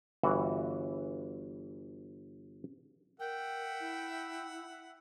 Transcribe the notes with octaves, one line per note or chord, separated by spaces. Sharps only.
G1 E3 F#4
A#4 E5 F#5 G5
E4